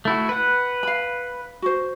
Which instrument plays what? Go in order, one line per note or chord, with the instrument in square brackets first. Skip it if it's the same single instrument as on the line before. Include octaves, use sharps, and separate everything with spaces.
[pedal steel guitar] A3 E4 F#4
B4 F#5
[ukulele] F5 B5
F#4 C5